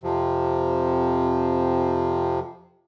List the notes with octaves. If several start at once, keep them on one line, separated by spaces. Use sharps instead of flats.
F2 C3 F3